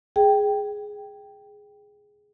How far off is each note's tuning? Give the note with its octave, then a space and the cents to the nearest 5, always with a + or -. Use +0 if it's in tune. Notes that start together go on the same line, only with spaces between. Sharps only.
G#4 +0 G5 +0